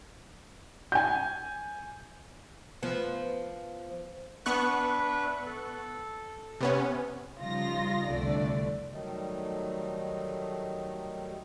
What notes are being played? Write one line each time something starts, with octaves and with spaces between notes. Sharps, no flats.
G#5 G6
F3 B3
B3 D4 B4 E5 C#6 F#6
A4
C3 B3 C#4
C#3 F3 G3 D#4 F4 A#6
C2 F2 D3 A3 D5
D#3 F#3 G3 A3 D#4